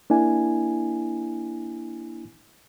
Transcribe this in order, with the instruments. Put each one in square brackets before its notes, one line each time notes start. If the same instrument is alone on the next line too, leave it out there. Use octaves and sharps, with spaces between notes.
[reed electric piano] A#3 D4 E4 G#5